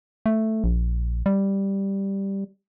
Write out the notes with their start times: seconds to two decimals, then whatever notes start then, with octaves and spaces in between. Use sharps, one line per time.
0.26 A3
0.64 A#1
1.26 G3